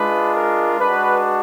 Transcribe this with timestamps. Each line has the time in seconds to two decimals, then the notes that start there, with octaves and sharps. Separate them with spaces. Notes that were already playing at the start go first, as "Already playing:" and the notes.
Already playing: G#3 D4 F4 B4
0.35 A#4
0.79 G#3 D4 F#4 B4